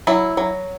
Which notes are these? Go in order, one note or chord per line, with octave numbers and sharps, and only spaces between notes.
F#3 E4
F#3